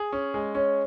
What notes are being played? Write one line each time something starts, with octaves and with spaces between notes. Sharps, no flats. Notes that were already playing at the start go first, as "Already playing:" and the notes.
Already playing: G#4
C#4
G#3
C#4 C#5